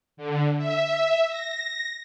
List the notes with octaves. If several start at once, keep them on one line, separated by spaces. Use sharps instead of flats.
D3
E5
A#6